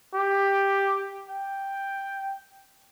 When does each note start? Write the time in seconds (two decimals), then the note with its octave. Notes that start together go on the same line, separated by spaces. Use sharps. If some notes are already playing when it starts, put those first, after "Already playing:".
0.15 G4
1.30 G5